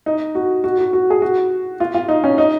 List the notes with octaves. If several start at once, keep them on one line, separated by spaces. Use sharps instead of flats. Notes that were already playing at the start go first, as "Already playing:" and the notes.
D#4
F#4
F#4
F#4
F#4
G#4
F#4
F4
F4
D#4
C#4
D#4